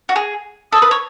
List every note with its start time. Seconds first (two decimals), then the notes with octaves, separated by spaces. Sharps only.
0.09 F#4
0.16 G#4
0.72 A4 D#6
0.82 B4
0.91 C#5